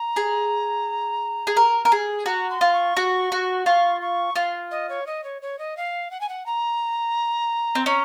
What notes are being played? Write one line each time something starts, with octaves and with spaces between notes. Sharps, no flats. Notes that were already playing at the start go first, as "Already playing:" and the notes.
Already playing: A#5
G#4
G#4
A#4
A#4
G#4
F#4 A#5
C6
F4
C#6
F#4
F#4
F4 C#6
C#6
F4 F5
D#5
C#5
D#5
C#5
C#5
D#5
F5
F#5
G#5
F#5
A#5
C4
C#4 A#5